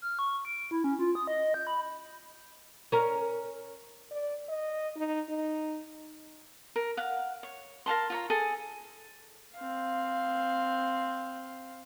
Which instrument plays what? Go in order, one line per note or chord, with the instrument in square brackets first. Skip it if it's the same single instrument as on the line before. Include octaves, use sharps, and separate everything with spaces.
[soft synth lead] F6
C#6
D7
E4
C#4
F4
D#6
D#5
G6
B5
[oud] C#4 A#4
[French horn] D5
D#5
D#4
D#4
[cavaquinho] A#4
F5 F#5
C#5
A#4 F5 A5 C6
F4 C#5 A#5
G#4 A4 G#5 D#6
[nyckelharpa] C4 F5